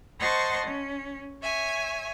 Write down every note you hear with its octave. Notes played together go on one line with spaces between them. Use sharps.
C5 D#5 F#5 A5 C6 C#6
C#4
C#5 E5 G#5